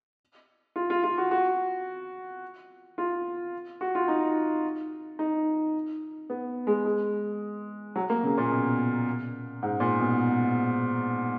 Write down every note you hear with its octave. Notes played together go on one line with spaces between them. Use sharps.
F4
F4
F4
F#4
F#4
F4
F#4
F4
D#4
D#4
B3
G#3
G#3
F#3
A#3
C#3
A#2
B2
G#2
A#2
B2